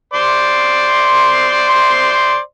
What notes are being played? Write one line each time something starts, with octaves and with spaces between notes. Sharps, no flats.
C5 D5 C6